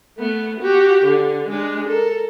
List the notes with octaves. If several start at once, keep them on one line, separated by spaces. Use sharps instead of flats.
A3 B3
F#4 G4
D3
G#3 D4
A4 A#4